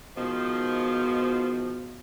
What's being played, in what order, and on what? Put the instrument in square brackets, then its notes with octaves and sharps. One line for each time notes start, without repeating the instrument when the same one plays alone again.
[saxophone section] G#2 D#3 F3 [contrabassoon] B2